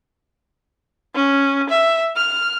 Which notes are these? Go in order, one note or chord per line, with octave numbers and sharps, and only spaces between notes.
C#4
E5
F6